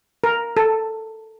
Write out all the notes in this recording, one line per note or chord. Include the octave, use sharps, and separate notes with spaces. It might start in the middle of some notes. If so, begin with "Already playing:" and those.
A#4
A4